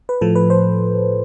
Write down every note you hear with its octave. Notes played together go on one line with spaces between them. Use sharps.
B4
A2 F3 A4
B4
C5